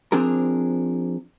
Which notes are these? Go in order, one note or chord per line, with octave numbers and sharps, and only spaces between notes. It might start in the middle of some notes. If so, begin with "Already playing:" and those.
F3 C4 D4 G#4 A#4